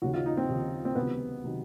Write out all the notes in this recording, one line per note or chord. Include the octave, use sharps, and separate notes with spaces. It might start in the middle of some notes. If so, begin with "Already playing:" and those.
D#2 C#3 F3 F#4
F4
D#4
C4
D#2 C#3 F3
C4
C#2 C3 D#3 F#3 B3
C3 D#3 F#3